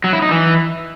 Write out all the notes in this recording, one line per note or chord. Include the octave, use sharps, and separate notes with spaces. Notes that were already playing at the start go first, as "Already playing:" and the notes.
F#3
E4
D#4
E3